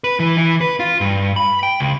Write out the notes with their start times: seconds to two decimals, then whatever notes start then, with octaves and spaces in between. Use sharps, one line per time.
0.04 B4
0.20 E3
0.38 E3
0.61 B4
0.80 F4
1.01 G2
1.36 B5
1.63 G5
1.80 C#2